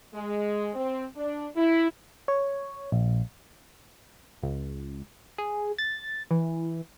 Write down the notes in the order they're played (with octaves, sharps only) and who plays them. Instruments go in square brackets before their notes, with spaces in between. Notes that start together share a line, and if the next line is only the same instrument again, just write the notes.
[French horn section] G#3
C4
D4
E4
[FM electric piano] C#5
A#1
[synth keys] C#2
G#4
A6
E3